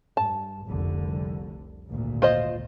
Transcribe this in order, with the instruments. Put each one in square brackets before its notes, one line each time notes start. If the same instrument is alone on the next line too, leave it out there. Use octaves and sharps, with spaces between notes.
[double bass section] G2 [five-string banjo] A5
[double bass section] F1 C2 D3
G#1 D2 A#2
[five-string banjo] F4 C5 D#5